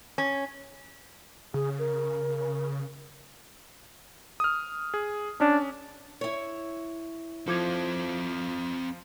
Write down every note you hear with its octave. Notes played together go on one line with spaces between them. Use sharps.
C#4
C#3 G#4
A#4
D#6 F6
G#4
C#4 D4
E4 C#5
F3 C4 A4 D6 G#6